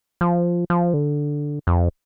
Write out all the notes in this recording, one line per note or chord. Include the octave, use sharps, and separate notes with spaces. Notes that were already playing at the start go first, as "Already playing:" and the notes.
F3
F3
D3
F2